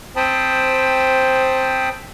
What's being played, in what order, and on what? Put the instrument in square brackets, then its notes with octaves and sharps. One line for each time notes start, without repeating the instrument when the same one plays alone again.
[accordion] C4 C5 G5 A5 B5 D#6